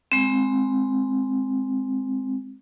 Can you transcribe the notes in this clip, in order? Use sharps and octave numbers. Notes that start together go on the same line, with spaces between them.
G#3 C4